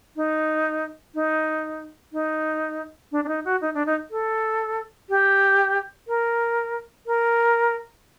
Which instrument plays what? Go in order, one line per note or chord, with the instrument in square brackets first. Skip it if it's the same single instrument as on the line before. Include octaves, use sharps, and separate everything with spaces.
[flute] D#4
D#4
D#4
D4
D4
D#4
F#4
D#4
D4
D#4
A4
G4
A#4
A#4